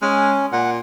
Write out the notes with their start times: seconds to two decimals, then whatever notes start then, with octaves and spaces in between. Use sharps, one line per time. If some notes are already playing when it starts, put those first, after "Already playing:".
0.02 G#3 C#4
0.52 A#2 F#5